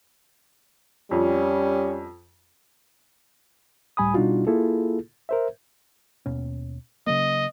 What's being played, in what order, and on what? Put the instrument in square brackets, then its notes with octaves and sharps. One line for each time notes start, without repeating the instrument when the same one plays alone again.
[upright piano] F2 [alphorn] G3 [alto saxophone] C#4
[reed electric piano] C#2 A2 G3 G#5 B5 D#6
B2 G3 D4 D#4 F4 F#4
A#3 E4 F4 G#4 A4
A#4 C5 E5
[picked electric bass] D#2 B2 C#4
[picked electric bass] C#3 F#3 A#3 [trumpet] D#5